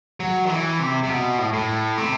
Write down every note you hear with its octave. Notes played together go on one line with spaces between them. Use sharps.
F#3
D#3
E3
C3
C3
B2
A2
A2
C3